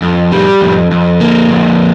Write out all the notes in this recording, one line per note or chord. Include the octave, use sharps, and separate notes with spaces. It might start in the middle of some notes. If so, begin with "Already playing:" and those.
F2
G3
F2
F2
A#3
F2